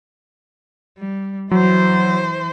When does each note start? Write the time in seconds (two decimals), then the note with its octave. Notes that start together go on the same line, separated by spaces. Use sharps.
0.98 G3
1.51 E3 F#3 C5